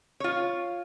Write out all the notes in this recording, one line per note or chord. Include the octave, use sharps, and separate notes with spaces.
F4 C#5